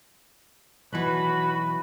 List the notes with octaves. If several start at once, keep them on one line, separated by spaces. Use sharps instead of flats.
B1 E3 F#4 B4 B5